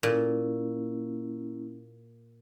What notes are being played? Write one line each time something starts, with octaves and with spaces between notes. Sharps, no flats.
A#2 A#3 C#4 E4